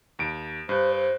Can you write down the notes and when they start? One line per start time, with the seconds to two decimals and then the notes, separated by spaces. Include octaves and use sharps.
0.19 D#2 D7
0.69 G2 C5 F#6
0.95 C5